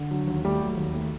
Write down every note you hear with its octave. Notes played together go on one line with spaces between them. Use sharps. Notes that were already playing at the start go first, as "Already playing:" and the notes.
Already playing: D3
F#3
D#2
G3 A3 G4
F#3
D#2
A3